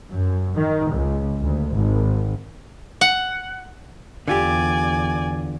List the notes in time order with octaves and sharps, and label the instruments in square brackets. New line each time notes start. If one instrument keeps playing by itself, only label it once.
[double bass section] F#2
D#3
C#2
D2
G#1
[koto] F#5
[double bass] E2 [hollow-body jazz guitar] D3 F4 G4 [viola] D5 G#5